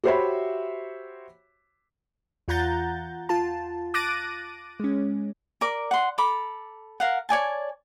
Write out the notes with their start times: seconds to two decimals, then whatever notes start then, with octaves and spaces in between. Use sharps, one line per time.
0.04 F#4 G4 C5 C#5 E5 B5
2.48 E2 F4 F#5 A#5 G6 A6
3.29 F4 A5
3.94 D6 F#6 A6 A#6 D7 D#7
4.80 G#3 C#4
5.61 A#4 D5 D6
5.91 F#5 C6
6.18 A4 A#5 B5 D6
7.00 A#4 F5 F#5
7.29 C#5 D5 G#5 A5